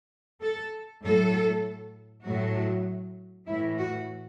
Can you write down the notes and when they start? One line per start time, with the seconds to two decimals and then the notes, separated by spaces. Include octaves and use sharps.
0.42 A4
1.03 A2 F#3 A4
2.25 A2 F#3 F#4
3.47 A2 E3 E4
3.78 F#4